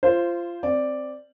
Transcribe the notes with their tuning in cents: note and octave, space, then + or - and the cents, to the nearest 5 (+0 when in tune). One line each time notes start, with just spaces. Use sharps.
F4 -20 C5 +0
C4 +0 D5 +0